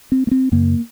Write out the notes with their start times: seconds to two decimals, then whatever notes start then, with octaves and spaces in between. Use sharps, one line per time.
0.12 C4
0.27 A#3
0.31 C4
0.52 F#2 C#3 A#3